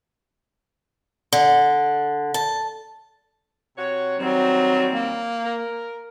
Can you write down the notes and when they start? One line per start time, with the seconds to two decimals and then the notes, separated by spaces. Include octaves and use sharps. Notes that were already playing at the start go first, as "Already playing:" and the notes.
1.33 D3
2.34 A5
3.78 C3 F#4 C#5
4.19 D#3 F#3 G3 C4
4.91 A#3
5.44 A#4